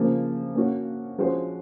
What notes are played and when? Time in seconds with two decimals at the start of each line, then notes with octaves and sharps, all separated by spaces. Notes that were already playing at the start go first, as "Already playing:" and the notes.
Already playing: C#3 F3 A#3
0.55 A#3 C#4 F#4
1.18 F3 G#3 C#4 F#4 C5